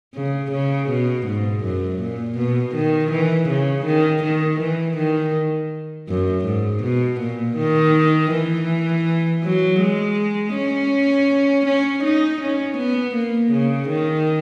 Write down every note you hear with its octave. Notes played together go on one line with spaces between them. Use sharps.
C#3
C#3
B2
G#2
F#2
A#2
B2
D#3
E3
C#3
D#3
D#3
E3
D#3
F#2
G#2
B2
A#2
D#3
E3
F#3
G#3
C#4
C#4
D#4
C#4
B3
A#3
C#3
D#3